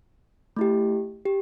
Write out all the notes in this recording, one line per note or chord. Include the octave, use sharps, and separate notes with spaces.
A3 E4 G4
G4